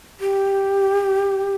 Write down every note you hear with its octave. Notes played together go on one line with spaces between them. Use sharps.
G4